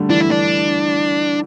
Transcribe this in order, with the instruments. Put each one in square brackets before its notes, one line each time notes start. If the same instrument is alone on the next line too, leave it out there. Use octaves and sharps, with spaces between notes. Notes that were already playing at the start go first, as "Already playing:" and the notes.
Already playing: [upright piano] D3 G3 A3
[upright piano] E3 [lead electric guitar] D4
[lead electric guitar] E4
D4